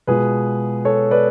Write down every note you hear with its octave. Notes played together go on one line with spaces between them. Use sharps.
B2 G#3 B3 F4 G#4 B4
A4 C#5
B4 D5